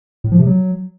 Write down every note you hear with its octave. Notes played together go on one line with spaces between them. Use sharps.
A2
F3
C3
F#3